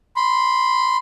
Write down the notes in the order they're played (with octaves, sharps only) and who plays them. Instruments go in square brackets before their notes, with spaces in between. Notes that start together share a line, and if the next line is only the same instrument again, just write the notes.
[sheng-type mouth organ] B5 C6